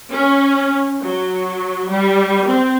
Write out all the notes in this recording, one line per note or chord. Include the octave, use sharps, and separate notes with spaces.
C#4
F#3
G3
C4